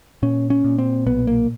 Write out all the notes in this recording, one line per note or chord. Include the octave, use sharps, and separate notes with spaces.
A#2 C#4
C#4
A#2
C4
B1 B3
A#3